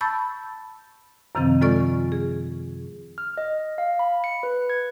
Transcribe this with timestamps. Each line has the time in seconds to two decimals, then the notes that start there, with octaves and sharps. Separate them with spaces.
0.01 A5 B5 C#6 E6 G6 A6
1.35 F#2 C3 D#3 F3 C4
1.61 G#3 F4 A4 D5 C#6
2.12 G#4
3.18 F6
3.38 D#5
3.78 F5
3.99 B5
4.24 C#7
4.43 B4
4.70 G#6